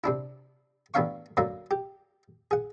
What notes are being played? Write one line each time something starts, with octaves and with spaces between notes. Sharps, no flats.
C3 D4 E4
A1 B3 D4 E5 F5 C#6
F#2 D3 A#3 E5 F#5
G4
G#4 F#5